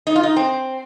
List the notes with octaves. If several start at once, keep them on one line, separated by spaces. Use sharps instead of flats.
D#4
F4
D#4
C4